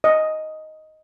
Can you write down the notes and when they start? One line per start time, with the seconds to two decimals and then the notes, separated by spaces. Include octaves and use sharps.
0.04 D#5